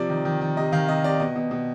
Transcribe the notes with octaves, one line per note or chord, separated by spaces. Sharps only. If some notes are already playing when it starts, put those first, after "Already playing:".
Already playing: C3 F3 D5
D#3
D#3
D#3
C3 D#5
D#3 F5
C3 D#5
C3 D5
B2 D#5
B2
B2